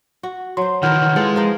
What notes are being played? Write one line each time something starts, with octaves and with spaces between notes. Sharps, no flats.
F#4
F#3 C5 C6
D#3 E3 A#4 B4 F#5 F6 G6
G#3 E4 F4 G#4 A4 B4
F3 A#4 C5